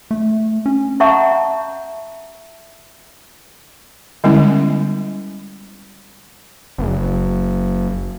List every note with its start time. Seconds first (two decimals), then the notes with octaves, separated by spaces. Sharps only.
0.11 A3
0.66 C#4
1.00 C#5 E5 F#5 A5 A#5 C#6
4.24 D3 G3 G#3 B3 C#4 E4
6.78 F#1